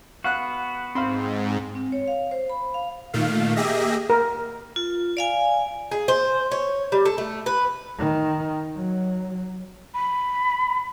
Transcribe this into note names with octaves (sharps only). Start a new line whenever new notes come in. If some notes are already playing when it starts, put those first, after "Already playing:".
B3 F#4 F5 F#5 F#6
G#2 C4 F5 B5 C6
C4
C#5
F5
C5
B5
F5
A#2 D#3 A3 F5
A#3 G4 G#4 D#5 E5 A#6
A#4
F4
D5 F5 G#5
G#4
C5
C#5
G3
A4
A3
B4
D#3
F#3
B5